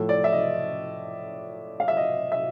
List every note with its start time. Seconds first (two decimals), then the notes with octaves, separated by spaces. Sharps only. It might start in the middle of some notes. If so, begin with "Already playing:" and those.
Already playing: A2 F3 A4
0.09 D5
0.24 E5
0.33 D#5
1.80 F5
1.88 E5
1.97 D#5
2.32 E5